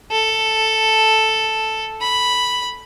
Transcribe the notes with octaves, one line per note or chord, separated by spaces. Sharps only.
A4
B5